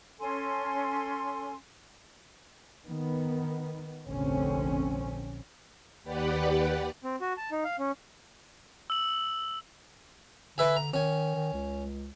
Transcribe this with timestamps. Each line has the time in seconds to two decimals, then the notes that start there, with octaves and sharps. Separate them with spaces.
0.20 C#4 A4 G#5 C6
2.85 D#3 B3
4.06 F1 A#1 D3 C4 C#4
6.03 D#2 G4 B4 D5 F#5
7.04 C4
7.21 F#4
7.37 A5
7.51 D#4
7.64 F5
7.79 C#4
8.90 E6 F#7
10.58 D3 B4 E5 G#5
10.76 A#5
10.94 D#3 C#4 G#5
11.35 D#3
11.53 C#2